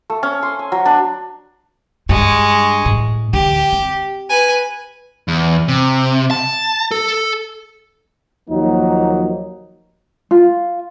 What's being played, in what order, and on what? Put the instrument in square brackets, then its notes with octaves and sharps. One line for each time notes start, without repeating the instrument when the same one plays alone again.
[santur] A3
C#4
C6
G#5
F#3
D4
[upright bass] G2 [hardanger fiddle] G#3 C#6
[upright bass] A2
[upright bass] D2 [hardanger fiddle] G4
[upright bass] C4
[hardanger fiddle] B4 G#5
[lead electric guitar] E2
C3
A5
A4
[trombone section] D#2 F3 F#3 A#3 D#4
[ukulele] F4